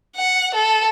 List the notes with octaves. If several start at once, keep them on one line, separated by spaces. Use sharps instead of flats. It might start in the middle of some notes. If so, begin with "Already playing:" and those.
F#5
A4